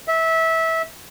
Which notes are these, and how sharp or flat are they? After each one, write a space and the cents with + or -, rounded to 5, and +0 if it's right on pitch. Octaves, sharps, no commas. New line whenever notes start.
E5 -20